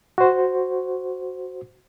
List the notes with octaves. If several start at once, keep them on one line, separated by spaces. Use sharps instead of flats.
F#4 C5